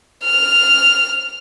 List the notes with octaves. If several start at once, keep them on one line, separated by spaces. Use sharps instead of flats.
F6